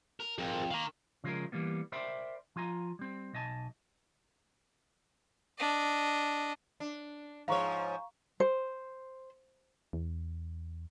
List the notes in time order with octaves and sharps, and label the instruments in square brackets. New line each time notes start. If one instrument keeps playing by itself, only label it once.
[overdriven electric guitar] A#4
[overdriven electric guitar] F2 [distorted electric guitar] G#4 A#4
[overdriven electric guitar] D#3 [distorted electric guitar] F5 A#5
[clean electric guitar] C#3 F3 G#3 D#4 G#4 A#4
E3 G3 A#3 B3
A#4 C5 D5 E5 G5 B5
F3 F4 G#5 A#5
G3 C4
B1 D#5 G#5 A5
[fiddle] D4 D#5
[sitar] D4
[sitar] G#2 F3 C#5 [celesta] F5 A#5 C#6
[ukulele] C5
[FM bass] E2